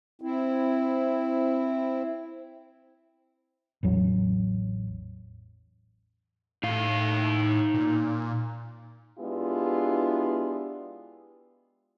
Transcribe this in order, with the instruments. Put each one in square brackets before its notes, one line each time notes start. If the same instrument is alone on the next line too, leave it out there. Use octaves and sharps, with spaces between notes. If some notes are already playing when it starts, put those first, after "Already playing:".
[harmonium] C4 E4
[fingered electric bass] A1 E2 F#3
[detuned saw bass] A2 [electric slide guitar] D#4 F5
[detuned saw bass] A#2
[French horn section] G#3 B3 D4 E4 F4 G4